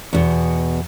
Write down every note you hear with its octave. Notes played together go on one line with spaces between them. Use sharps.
E2 B2